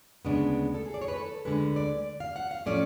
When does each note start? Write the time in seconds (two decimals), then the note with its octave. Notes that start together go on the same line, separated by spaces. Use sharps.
0.25 D2 C#3 G#3 B3 D4
0.74 A4
0.85 G#4
0.94 D5
1.02 C#5
1.08 B4
1.16 A4
1.45 D2 D3 G#3 B4
1.76 D5
2.20 F5
2.36 F#5
2.51 F5
2.66 A2 F3 A3 C#4 D5